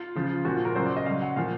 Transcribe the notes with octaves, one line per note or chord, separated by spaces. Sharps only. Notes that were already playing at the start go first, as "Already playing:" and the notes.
Already playing: F4
C#3 F3
A#2 F3 F#4
F4
A#4
C#3 F#3 C5
D5
D#5
C#3 F#3 F5
F#5
A#2 F3 F5